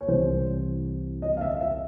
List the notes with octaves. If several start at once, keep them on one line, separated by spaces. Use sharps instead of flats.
C#5
C2 C3 E3 C5
D#5
F5
E5
E5